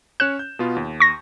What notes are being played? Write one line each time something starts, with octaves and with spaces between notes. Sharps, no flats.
C#4 C#5 F#6 E7
G6
B2 B3 F4
D#2
C#6 A#6